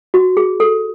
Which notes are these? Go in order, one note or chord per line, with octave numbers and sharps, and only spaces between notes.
F#4
G#4
A4